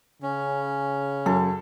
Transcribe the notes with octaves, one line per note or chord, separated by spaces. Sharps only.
C#3 C#4
F#2 A4